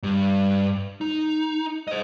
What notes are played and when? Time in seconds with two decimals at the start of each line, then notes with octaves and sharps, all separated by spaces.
0.03 G2
1.01 D#4
1.88 C5 D#5